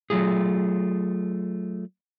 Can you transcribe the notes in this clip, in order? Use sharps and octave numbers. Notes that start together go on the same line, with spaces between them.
F#3 A3 F4 G#4